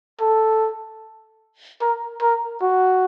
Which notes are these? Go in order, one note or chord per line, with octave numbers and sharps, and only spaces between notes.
A4
A#4
A#4
F#4